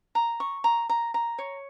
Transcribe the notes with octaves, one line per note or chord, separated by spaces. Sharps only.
A#5
C#6
A#5
A#5
A#5
C#5